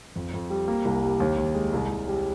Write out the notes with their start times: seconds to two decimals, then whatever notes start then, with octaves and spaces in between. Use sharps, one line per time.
0.16 F2
0.33 F2
0.50 G3
0.68 A#3
0.85 C2
1.03 G3
1.20 D#2
1.38 D#2
1.55 G#3
1.73 C2
1.89 C2
2.08 G3